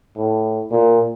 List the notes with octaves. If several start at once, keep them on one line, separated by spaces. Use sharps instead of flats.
A2
A#2